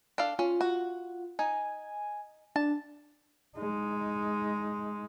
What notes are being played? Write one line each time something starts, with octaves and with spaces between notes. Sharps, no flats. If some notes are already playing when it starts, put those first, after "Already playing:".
D4 A4 F5
C#4 F4
F#4
D#4 G#5
D4 A5
G#3 D#4